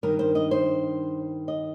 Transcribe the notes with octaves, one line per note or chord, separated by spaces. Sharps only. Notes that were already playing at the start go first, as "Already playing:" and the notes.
G2 D#3 A#4
C5
D#5
C5
D#5